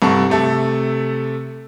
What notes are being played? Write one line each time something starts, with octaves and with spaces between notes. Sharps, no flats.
C2 G2 A4 C#6
C3 A3 A4